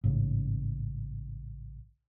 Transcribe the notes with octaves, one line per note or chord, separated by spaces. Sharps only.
A1 G#2 C#3